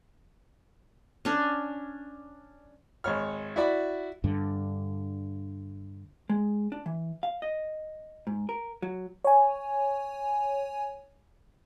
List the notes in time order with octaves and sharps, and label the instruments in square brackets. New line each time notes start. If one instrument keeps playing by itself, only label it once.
[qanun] C#4 D4
[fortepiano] G#1 C#5 F6
E4 F#4 D5 B5
[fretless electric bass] G2 D3
[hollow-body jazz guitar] G#3
D4
E3
F5
D#5
G#2
A#4
F#3
[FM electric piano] C#5 G#5